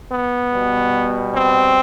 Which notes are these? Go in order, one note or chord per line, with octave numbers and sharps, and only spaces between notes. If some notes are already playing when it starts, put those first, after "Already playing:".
B3
B2 G3
C4